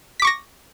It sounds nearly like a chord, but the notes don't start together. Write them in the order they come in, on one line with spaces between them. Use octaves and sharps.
B6 D6 C#6 A#6